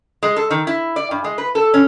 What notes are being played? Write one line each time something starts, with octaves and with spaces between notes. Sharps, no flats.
G#3
A4
D#3
E4
D5
G2
G#3
B4
A4
C#4